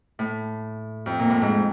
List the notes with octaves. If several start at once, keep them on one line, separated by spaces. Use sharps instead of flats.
A2
F2
A#2
A2
G#2